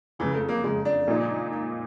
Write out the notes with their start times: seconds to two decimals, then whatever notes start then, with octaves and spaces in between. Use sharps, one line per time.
0.19 F#1 F2 C#3 E3
0.34 A3
0.49 A#3
0.64 F#1 F2 C#3 G#3
0.85 D4
1.08 A#2 F3 A#3 D#4